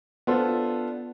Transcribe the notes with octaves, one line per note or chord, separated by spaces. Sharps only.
B3 D4 F4 A4 C5